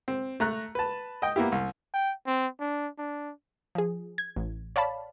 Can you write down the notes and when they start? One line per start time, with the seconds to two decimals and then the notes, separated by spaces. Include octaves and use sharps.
0.08 C4
0.40 A3 A#5 F#6
0.75 B4 A5
1.22 D#5 G5
1.36 A#3 B3 E4 G4
1.52 C2
1.94 G5
2.26 C4
2.60 D4
2.98 D4
3.75 F3 G#4
4.18 G#6
4.36 A1
4.76 C#5 D5 F5 A5 B5